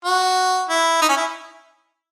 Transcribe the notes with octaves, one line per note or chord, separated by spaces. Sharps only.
F#4
E4
D#4
C#4
E4